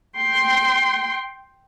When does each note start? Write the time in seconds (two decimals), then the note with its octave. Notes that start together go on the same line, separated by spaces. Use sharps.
0.17 G5 C6